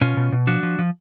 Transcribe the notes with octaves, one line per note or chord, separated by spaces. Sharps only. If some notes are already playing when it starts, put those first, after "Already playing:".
B2 C#4 F4
B2
B2
F3 D4 F#4
F3
F3